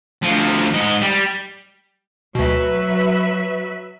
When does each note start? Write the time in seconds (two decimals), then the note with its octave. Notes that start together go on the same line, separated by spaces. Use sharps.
0.23 D2 F3
0.73 G#2 D#5
1.01 G3
2.35 D2 B2 F#3 B4 E5